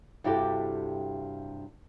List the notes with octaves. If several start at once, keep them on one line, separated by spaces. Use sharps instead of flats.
G2 C3 E4 F#4 G4 A4